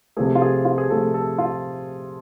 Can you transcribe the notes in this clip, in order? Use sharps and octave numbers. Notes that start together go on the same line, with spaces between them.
C3 F3 A3 G#4
F4
G#4
F4
G#4
C3 F3 A3 A4
A4
F4